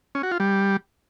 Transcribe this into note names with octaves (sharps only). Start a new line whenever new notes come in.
C#4
F#4
F4
G3